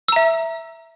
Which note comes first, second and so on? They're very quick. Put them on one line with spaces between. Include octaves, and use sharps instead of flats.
E6 A#5 E5